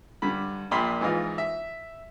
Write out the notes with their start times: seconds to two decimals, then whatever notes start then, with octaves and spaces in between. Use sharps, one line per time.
0.22 G2 D3 B5
0.71 A#1 A#2 G5 B5 C6
1.01 G#2 E3 D#4 F4
1.38 E5